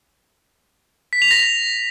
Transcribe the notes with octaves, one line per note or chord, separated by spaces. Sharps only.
B6
F7
A#6